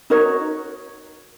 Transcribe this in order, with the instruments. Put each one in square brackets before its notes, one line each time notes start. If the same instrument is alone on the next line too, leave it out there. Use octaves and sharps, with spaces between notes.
[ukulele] D#4 F#4 A#4 C#5